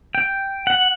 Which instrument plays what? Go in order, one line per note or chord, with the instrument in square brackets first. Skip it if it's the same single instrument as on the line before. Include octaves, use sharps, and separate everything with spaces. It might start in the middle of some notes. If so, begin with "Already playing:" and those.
[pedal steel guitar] G5
F#5